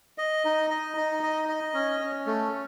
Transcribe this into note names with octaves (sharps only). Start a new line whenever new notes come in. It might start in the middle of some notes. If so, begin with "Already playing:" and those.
D#5
D#4
D#5
D#4
D#5
D#5
C#4
C#4
A3